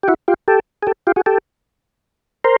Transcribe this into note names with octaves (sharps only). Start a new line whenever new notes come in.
G4
E4 F#4
F4 G4
G4 A4
G#4
G4 A4
F4 G4
F#4 G#4
G4 A4
A#4 C5